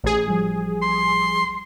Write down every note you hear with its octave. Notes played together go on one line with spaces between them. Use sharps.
A1 G#4
F3 G3
C6